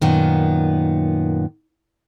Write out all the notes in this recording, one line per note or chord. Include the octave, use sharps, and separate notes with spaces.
F#2 A#2 D#3 B3